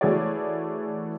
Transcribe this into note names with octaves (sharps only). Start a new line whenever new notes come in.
E3 A3 F#4 G#4 C#5 D5